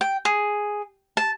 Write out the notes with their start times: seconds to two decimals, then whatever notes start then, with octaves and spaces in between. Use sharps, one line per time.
0.01 G5
0.25 G#4
1.17 A5